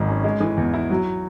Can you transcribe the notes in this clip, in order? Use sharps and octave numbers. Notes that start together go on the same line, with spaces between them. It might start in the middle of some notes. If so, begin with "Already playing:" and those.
Already playing: G#1 G#2 F#3
C#4
G#3
E3
E2
E4
F#3